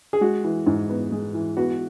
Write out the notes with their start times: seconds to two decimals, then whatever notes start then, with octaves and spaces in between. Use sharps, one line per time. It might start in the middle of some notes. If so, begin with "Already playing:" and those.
0.13 G#4
0.21 G#3 F#4
0.44 E3
0.66 G#2
0.89 B3
1.12 G#3
1.34 E3
1.57 B3 F#4